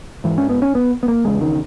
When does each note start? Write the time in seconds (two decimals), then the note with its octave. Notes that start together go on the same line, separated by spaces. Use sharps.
0.24 G#2 E3
0.38 C#4
0.49 B3
0.62 C#4
0.75 B3
1.03 B3
1.08 A#3
1.25 E2 C#3 G#3
1.41 D#3